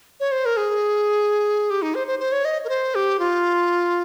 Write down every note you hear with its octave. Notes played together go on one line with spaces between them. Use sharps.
C#5
C5
A#4
G#4
G4
D#4
C5
C5
C5
C#5
D#5
A#4
C5
G4
F4